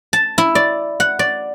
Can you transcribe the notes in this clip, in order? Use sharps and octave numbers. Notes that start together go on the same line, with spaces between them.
A5
E4
D5
F#5
D5